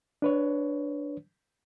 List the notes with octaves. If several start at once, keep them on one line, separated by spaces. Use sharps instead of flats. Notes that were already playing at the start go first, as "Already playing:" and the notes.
D4 B4 C#5